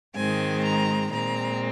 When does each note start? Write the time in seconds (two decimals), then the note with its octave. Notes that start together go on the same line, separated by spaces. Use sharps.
0.15 G#2 D#3 G#3 C4 G#5
0.64 A#5
1.11 A#2 G#3 C4 A#5